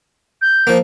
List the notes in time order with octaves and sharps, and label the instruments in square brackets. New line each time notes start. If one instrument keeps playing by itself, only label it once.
[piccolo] G6
[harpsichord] F3 A#3